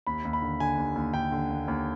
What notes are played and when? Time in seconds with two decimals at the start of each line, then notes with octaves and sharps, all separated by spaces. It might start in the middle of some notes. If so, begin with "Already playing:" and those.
0.07 D#2 B5
0.25 D#2
0.33 B5
0.42 D3
0.60 D3 G#5
0.78 D#2
0.96 D#2
1.14 D3 G5
1.32 D3
1.50 D#2
1.68 D#2